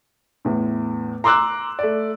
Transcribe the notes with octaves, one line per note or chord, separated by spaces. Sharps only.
E2 A2
A#5 C6 D6 E6 F#6
A3 D5